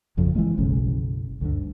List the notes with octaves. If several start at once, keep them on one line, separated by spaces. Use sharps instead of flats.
G#1 F2 C#3 F3
E3 F3 G#3 A#3
F#1 B1 C#3
D2 G2 D3